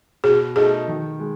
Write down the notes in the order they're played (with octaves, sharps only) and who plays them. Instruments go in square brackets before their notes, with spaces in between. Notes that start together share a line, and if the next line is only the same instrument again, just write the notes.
[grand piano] B2 [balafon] G#4
[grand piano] A3 D#4 A4 [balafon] G#4
[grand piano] D#3
G#3